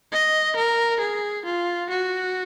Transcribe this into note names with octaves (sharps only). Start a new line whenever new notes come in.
D#5
A#4
G#4
F4
F#4